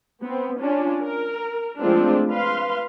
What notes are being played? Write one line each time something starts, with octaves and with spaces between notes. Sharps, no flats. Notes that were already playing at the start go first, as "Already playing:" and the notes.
B3 C4
C#4 D4 F4
A#4
F3 G#3 A3 C4 D4 F4
B4 F5 C6